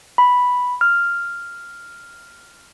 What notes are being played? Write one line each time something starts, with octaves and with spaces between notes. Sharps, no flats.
B5
F6